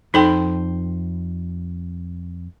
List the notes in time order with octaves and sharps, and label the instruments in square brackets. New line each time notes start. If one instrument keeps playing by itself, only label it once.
[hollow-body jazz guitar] F2 C5 [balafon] D#4 A4 G5